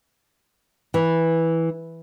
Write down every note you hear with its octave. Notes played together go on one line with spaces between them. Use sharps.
E3